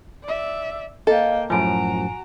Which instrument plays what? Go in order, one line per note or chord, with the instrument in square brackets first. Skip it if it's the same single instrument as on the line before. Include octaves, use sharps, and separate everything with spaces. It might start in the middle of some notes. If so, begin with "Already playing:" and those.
[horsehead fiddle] D5 E5
[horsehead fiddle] A#3 G5 [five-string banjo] A4 [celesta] D#5 F5
[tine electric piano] F#2 A2 F3 [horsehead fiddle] F#4 A#5 [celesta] G#5 D7